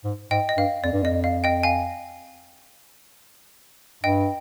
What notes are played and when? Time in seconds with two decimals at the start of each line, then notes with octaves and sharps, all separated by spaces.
0.04 G#2
0.31 G#2 D#5 G5
0.49 D#5
0.57 G2 F5
0.84 F2 D5
0.93 G2
1.03 F2 D#5
1.24 F5
1.44 D#5 G5
1.63 F5 G#5
4.03 G2 D#5 G5